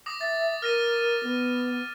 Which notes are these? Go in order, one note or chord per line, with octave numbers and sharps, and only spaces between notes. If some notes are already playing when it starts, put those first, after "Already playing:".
D6 D#6 A#6
E5 A6
A#4 F6 A#6 D#7
B3